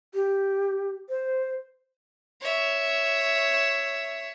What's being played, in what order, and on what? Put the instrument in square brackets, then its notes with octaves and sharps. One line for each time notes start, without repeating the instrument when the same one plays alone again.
[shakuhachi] G4
C5
[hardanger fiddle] C#5 E5